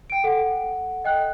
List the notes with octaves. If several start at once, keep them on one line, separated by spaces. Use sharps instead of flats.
G5 D7
A4 F#5
D#5 G5 F#6